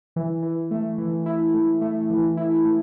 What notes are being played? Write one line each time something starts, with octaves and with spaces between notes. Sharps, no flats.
E3
E3
A3
E3
E4
A3
A3
E3
E4
A3